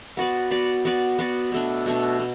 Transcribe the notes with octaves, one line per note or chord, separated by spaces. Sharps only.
B3 F#4 B4 D5
B3 F#4 B4 D5
B3 F#4 B4 D5
B3 F#4 B4 D5
B2 A3 D4
B2 A3 D4
B2